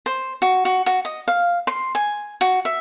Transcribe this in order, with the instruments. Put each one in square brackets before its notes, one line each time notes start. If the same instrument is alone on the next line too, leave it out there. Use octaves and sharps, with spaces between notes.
[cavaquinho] C5
F#4
F#4
F#4
D#5
F5
C6
G#5
F#4
E5